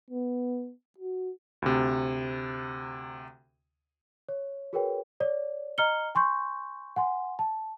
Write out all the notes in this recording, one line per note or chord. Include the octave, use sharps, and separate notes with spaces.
B3
F#4
D2 C3
C#5
F#4 G#4 A#4 B4 C#5 G5
C#5 D5
D#5 A#5 F6 C#7 G7
G#5 C6 C#6 G6
F#5 G#5 C6
A5